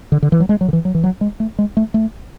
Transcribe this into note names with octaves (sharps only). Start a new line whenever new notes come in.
D3
D3
E3
F#3
G#3
F#3
D3
E3
F#3
E3
F#3
G#3
A3
G#3
A3
A3